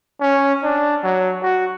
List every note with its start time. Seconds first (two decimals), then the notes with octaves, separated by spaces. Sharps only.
0.21 C#4
0.63 D4
1.03 F#3
1.43 F#4